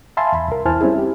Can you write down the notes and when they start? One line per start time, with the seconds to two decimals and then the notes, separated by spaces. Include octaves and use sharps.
0.17 E5 F5 G#5 A5 B5 C6
0.32 E2 B5
0.48 C2 A#4
0.65 E2 E4 C5 G#5 A5 F6
0.81 G3 C4 C#4 E4 G#4
0.98 G4